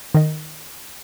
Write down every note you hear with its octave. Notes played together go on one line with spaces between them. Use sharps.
D#3 D#5